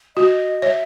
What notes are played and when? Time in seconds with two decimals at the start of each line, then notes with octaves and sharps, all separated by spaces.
0.16 F#4 D#5
0.62 C#5 E5